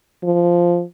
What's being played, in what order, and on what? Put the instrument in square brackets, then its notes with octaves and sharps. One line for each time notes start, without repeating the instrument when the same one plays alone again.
[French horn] F3